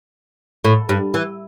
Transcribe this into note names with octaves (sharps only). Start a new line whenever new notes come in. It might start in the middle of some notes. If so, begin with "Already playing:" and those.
A2
G2
E3